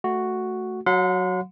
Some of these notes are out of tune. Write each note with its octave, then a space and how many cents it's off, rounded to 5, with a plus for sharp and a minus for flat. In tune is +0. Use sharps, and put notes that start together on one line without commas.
A3 +0 F#4 +0
F#3 +0 F#5 -40 C6 -35